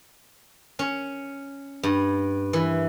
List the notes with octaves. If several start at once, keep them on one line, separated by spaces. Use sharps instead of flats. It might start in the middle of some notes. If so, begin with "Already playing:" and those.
C#4
G2
E3